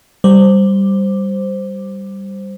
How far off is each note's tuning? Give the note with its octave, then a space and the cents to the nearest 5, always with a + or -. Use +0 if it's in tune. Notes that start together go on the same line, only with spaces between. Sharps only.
G3 +0 C5 +0